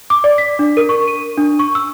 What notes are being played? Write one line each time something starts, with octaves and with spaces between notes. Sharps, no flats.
D6
D5
B6
D4
A#4
C#6
D#7
D4
C#6
E6